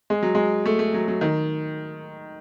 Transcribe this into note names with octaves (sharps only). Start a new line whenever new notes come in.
G#3
F#3
G#3
A3
A3
F#3
F#3
D#3